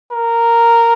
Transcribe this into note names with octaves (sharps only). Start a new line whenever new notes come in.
A#4